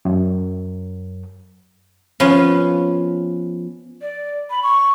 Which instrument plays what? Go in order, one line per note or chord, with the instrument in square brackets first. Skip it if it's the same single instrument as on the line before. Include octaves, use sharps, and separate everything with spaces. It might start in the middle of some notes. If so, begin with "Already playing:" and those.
[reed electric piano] F#2
[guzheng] F3 B3 C#4
[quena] D5
B5
C#6